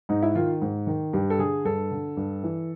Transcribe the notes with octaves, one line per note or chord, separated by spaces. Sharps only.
G#2 D#4
E4
D#3 F4
G#2
D#3
G2 G4
A4
D3 G#4
G2 A4
D3
G2
E3